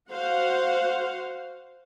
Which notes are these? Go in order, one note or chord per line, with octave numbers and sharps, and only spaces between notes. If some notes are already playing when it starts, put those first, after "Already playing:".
F#4 C5 F5 F#5